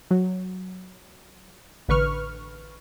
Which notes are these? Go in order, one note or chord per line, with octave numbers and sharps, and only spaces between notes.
F#3
A1 D3 B4 C#6 F6